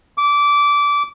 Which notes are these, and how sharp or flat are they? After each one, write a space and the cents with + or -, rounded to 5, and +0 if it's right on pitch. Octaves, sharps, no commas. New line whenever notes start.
D6 -20